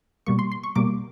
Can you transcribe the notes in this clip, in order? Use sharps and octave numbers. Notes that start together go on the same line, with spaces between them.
B2 G3 A#3 C#6
C6
C6
C#6
B2 G3 A#3 D6